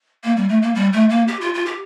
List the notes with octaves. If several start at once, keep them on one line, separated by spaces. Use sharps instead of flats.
A#3
G3
A3
A#3
G3
A3
A#3
G4
F4
F4
G4